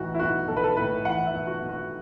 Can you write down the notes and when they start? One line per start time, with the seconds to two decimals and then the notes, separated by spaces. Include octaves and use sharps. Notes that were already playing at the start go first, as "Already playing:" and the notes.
Already playing: B1 A2 E3 F#4
0.15 E4
0.19 B1 F#4
0.48 B1 A4
0.56 B4
0.64 A4
0.77 A2 B4
1.05 E3 F#5
1.26 E5
1.33 B1
1.47 F#4
1.62 B1
1.69 F#4